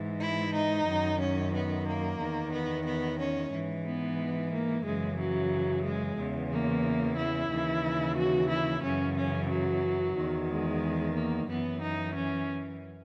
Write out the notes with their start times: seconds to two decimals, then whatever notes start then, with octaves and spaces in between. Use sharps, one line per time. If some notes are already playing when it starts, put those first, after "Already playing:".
Already playing: G#2 E3
0.20 E4
0.55 D#4
0.87 F#2 D#3
1.20 C#4
1.54 B3
1.87 A#3
2.20 E2 D#3
2.52 B3
2.86 B3
3.19 C#4
3.52 G#2 E3
3.85 B3
4.52 A#3
4.84 F#2 C#3 E3 G#3
5.18 F#3
5.84 G#3
6.17 E2 C#3 E3
6.50 A#3
7.17 E4
7.50 D#2 C#3 E3
8.16 F#4
8.50 E4
8.83 F#2 C#3 E3 C#4
9.16 C#4
9.49 F#3
10.16 E2 D#3
10.48 G#3
11.14 A#3
11.47 F#2 E3 B3
11.81 D#4
12.14 C#4